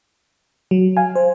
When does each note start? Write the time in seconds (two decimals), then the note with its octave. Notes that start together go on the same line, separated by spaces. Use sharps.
0.71 F#3
0.97 F5 G#5
1.16 C5